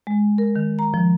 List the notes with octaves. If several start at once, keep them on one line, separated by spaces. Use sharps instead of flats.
G#3
A#4
D#3
A#5
F3